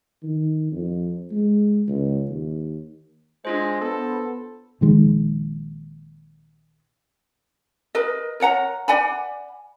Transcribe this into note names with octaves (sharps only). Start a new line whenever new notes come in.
D#3
F2
G#3
C#2
D#2
G#3 D4 F4 C5
B3 A4
A#1 D#3 G#3
A#4 B4 D#5
A#4 C#5 F#5 A#5
D5 F#5 G#5 B5